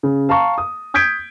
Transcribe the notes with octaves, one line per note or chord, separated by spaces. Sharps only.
C#3
F5 A5 A#5 C#6
D#6
D#6 G6 G#6 B6 D7